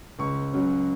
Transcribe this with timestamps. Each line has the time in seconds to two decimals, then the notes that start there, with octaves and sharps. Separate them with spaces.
0.19 C#2 C#6
0.53 C#3 F#3